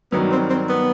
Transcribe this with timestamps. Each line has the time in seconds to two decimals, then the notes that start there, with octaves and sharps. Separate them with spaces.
0.12 G2 D#3 F#3 B3
0.32 C4
0.50 C4
0.69 B3